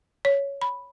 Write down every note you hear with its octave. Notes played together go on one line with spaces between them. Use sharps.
C#5
B5